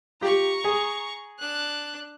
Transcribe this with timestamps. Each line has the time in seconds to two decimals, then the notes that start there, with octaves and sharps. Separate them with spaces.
0.21 F4 G4 A#5 C#6
0.64 G#4
1.39 D4 F#6